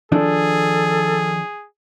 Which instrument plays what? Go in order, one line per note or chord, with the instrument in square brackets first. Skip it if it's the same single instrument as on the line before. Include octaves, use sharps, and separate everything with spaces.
[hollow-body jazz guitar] D#3 F3 D4 [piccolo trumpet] G#4 [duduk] A4